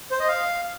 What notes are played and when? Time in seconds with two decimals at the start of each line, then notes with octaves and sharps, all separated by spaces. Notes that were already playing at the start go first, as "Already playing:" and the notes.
0.11 C5
0.20 D#5
0.28 F5